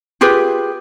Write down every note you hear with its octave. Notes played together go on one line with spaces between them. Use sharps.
F4 G4 G#4 B4